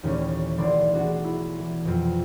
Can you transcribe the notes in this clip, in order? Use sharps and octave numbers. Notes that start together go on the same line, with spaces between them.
D#2 A#2 E3 A3 C#4
D#1 B1 E3 D5 C6
D4 F#4 G#4
E4
E3
F2 B2